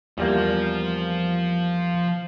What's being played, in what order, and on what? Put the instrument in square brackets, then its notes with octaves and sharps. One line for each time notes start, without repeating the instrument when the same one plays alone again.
[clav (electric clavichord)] E2 G3 A#3 [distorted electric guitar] F3